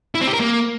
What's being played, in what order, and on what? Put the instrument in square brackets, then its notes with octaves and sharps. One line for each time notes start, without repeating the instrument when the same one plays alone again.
[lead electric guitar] E4
C4
G4
A#4
A#3